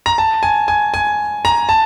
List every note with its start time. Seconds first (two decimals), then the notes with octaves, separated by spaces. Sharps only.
0.06 A#5
0.18 A5
0.43 G#5
0.68 G#5
0.94 G#5
1.45 A#5
1.69 A5